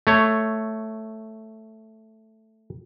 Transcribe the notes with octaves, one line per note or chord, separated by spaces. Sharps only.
A3 C#5